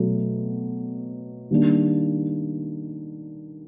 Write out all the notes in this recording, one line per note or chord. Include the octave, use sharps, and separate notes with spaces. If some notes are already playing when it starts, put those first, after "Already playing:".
Already playing: B2 F#3 A3
D#3 G3 A#3 D4